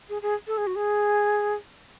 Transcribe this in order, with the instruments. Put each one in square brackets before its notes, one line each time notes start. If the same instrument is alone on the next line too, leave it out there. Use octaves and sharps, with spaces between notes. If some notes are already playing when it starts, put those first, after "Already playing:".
[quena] G#4
G#4
A4
G#4
F#4
G#4